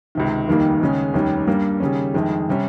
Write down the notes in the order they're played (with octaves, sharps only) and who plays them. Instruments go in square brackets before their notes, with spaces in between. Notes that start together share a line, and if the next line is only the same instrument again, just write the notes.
[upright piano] C#2 C3 D#3
F1 D#2 D#3 G3 A#3
D#2 C#3 G#3 C#4
F1 D#2 D#3 G3 C#4
G2 G3 A#3
D#2 C#3 G3 C#4
G1 F2 D#3 G#3
C3 G3 C#4